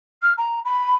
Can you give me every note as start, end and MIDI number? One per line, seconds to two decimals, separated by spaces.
0.22 0.33 89
0.37 0.59 82
0.64 0.95 83